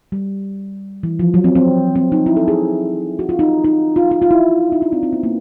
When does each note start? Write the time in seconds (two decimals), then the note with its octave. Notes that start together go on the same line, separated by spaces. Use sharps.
0.12 G3
1.03 E3
1.19 F3
1.34 F#3
1.44 C4
1.55 C4
1.95 C4
2.12 D#4
2.26 E4
2.37 A4
2.48 G#4
3.19 F#4
3.29 F4
3.39 D#4
3.65 D#4
3.96 F4
4.11 F4
4.22 F4
4.31 E4
4.72 D#4
4.82 D4
4.92 C4
5.03 C4
5.13 B3
5.23 A#3